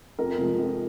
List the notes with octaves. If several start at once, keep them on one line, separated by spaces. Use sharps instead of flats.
F2 A#4
C3 F3 G#3
F2